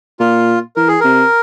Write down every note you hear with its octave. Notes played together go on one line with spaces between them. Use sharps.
A#2 F4
E3 A#4
G#4
C3 A#4